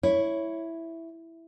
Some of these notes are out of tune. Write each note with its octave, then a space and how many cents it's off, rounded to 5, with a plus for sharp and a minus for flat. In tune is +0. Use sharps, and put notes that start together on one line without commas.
E4 +0 C#5 +0